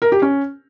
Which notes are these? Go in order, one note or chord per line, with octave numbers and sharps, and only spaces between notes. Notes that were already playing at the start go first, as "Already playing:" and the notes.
A#4
G4
C#4